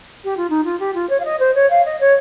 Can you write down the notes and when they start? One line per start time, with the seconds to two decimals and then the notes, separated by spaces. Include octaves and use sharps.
0.24 G4
0.37 F4
0.49 D#4
0.64 F4
0.79 G4
0.94 F4
1.09 C#5
1.19 F5
1.24 D#5
1.39 C5
1.55 C#5
1.70 F5
1.85 D#5
2.00 C#5